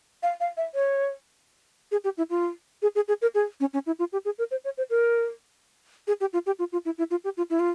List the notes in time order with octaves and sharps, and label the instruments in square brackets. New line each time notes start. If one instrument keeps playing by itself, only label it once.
[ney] F5
F5
E5
C#5
G#4
G4
E4
F4
G#4
G#4
G#4
A#4
G#4
C#4
C#4
E4
F4
G4
G#4
A#4
C5
C#5
C5
A#4
G#4
G4
F4
G4
F4
F4
E4
E4
F4
G4
F4
E4
F4